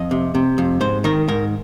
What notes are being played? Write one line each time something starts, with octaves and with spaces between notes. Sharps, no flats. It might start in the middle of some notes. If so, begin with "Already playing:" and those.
Already playing: F2 D#5
C3
C3
F2
G#2 C5
D#3 A#4
G#2 A#4